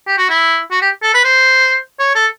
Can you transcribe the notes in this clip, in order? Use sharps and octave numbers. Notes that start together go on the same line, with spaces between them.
G4
F#4
E4
F#4
G4
A4
B4
C5
C#5
A4